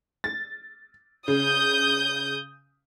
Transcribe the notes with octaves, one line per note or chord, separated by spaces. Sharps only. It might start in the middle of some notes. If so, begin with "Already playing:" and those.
A6
C#3 D#6 G6